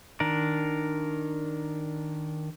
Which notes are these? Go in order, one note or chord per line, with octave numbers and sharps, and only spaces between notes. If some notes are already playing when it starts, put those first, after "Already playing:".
D#3 D4 A#4